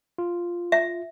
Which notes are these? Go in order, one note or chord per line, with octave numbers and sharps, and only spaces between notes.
F4
E5